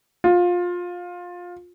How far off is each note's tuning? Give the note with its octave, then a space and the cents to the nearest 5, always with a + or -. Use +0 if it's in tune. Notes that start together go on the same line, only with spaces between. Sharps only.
F4 +20